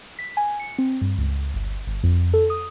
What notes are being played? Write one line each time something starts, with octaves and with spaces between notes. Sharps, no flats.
B6
G#5
C#7
C4
G2
C#2
G1
G1
F2
A4
D#6